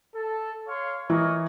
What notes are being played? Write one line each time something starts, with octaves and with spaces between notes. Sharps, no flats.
A4
C#5 F5 C6
E3 A#4 C#5 D#5